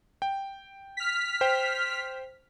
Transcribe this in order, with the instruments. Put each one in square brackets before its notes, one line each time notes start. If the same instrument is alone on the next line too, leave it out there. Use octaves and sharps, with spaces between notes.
[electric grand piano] G5
[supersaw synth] F6 B6
[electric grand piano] C5 G5